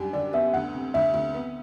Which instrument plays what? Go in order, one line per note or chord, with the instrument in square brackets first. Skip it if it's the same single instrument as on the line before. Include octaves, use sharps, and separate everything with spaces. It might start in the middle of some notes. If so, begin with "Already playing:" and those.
Already playing: [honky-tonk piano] F#2 G3 D4
[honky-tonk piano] D3 [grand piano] D5
[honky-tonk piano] B3 [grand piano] E5
[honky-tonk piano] D2 [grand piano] F#5
[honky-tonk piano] C3
[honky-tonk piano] D2 [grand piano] E5
[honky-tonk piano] D2
B3